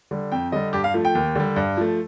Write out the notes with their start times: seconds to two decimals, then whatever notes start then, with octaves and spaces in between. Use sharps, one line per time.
0.11 D3 G3
0.32 F2 G5
0.52 D3 G3 D#5
0.73 G2 G4
0.84 F5
0.94 F3 A3
1.05 G5
1.15 D#2
1.36 D3 G3
1.56 G2
1.77 F3 A3